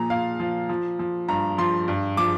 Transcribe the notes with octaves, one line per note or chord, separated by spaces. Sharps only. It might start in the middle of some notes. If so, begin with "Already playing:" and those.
Already playing: A#2 F3 A#5
A#2 F5
F3
F3
F3
G2 A#5
F3 C6
G2
F3 D6